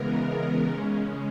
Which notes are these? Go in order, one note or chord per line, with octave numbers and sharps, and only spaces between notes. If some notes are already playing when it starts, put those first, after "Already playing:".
Already playing: C#3 E3 G#3 B3 A#4
C#3 G#3 C#4